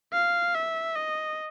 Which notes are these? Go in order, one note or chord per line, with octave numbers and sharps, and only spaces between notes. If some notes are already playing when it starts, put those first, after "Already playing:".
F5
E5
D#5